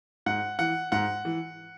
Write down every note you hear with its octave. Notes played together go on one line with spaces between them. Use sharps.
G#2 F#5
E3 F#5
G#2 F#5
E3